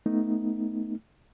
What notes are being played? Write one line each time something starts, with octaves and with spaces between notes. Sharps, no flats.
A3 B3 D#4